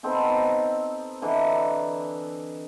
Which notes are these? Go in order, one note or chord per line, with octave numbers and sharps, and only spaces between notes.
B3 C4 D#4 A4
D3 E3 D#5 A#5